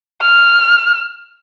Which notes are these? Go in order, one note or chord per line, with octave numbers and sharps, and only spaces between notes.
F6